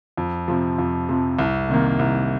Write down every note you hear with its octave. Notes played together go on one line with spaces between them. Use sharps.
F2
C3 F3
F2
C3 F3
C2
C3 D#3 A#3
C2